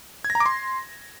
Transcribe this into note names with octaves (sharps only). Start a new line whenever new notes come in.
G#6
A#6
A#5
D6
C6